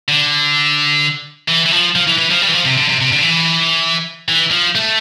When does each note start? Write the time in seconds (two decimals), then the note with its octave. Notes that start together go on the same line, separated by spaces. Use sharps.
0.08 D3
1.48 E3
1.66 E3
1.72 F3
1.95 F3
2.07 E3
2.18 E3
2.30 F3
2.42 G3
2.48 E3
2.53 F3
2.65 C3
2.77 D3
2.89 C3
3.00 C3
3.12 D3
3.23 E3
4.28 E3
4.51 F3
4.75 A3